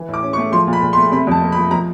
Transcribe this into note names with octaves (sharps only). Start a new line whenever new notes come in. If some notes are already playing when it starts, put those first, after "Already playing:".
Already playing: E3
A2
D6
C#4
C#6
A3
F3 C6
A#2
B5
A#2
C6
A3
C3 B5
F2 A5
A#3
B5
F3
F3 A#5